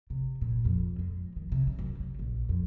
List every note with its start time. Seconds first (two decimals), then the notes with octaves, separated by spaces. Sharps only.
0.10 C3
0.41 A#2
0.65 F2
0.99 G#3
1.36 D#3
1.52 C3
1.67 C#3
1.79 F#2
2.00 C#3
2.19 A#1
2.49 F2